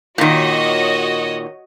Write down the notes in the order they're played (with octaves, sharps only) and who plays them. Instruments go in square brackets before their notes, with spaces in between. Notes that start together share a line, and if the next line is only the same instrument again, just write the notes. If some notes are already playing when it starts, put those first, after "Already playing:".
[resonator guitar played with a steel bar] A#2 D#3 [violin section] F#4 C#5 D#5